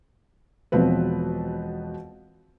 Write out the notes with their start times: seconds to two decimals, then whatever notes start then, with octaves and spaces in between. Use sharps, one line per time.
0.72 E1 B2 F3 C4 B4